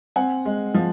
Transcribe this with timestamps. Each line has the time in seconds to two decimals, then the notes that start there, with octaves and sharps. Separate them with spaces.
0.16 C4 F#5 G#5
0.46 G#3
0.74 F3